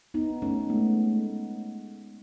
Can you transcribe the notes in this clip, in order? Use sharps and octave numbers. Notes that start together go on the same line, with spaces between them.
B3 D#4
A3 C#4
G#3 A3 B3